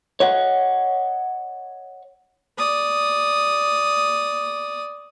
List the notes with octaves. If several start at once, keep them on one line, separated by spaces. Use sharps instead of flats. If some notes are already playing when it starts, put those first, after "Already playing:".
C#5 D#5 F#5
D5 D#6